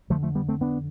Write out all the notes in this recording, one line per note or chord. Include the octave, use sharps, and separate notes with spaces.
F2 D3 F3 A3
F3 A3
G3 B3
A3 C4
B3 D4